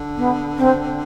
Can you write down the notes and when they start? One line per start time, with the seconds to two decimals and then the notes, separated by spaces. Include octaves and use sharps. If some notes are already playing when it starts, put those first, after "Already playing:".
Already playing: D3
0.16 B3
0.57 C4